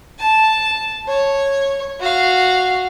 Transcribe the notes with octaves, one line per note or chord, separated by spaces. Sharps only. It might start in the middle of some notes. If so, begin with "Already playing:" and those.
A5
C#5
F#4 F5